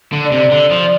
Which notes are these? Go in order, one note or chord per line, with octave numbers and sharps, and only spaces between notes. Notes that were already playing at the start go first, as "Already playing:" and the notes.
D3
D5
C3
D3
F3